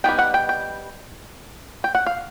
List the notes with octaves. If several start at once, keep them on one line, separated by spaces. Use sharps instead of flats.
G3 B3 D#4 G5
F#5
G5
G5
G5
F#5
F5